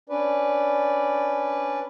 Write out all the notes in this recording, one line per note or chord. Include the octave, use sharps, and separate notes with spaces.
C#4 D4 B4 D5